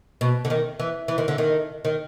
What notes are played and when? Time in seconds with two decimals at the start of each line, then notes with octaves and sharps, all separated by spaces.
0.21 B2
0.45 D3
0.50 D#3
0.80 E3
1.08 E3
1.18 D#3
1.28 D3
1.38 D#3
1.85 D#3